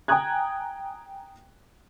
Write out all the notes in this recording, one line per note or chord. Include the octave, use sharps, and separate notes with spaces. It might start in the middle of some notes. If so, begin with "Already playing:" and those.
G5 G#5 A#5 D#6 F#6 G#6